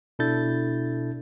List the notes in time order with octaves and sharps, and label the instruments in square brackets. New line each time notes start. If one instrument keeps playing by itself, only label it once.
[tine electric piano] B2 D4 E4 A4 G6 A6